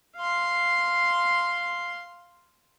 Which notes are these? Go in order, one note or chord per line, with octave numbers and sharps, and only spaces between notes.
F5 C6